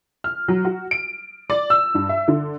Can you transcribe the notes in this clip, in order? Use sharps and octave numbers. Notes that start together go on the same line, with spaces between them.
F6
F#3
F#4
D7
D5
E6
G2
E5
D3